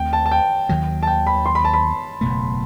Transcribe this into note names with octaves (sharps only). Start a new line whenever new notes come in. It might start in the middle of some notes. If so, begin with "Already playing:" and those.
Already playing: D#2 D#3 A3 C4 G5
A5
A5
G5
D#2 D#3 F#3
A5
G5
B5
C6
B5
A5
B5
F#1 E2 B2 A3